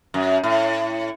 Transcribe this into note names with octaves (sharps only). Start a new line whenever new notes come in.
F#2
A2